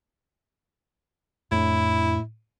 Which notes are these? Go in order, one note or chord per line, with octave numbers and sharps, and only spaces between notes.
F2 A2 B3 D4 E4